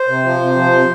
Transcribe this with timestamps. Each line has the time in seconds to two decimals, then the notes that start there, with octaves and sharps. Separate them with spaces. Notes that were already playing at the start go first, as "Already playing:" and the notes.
Already playing: C5
0.08 C3
0.24 F3
0.40 C3
0.56 F3
0.72 C3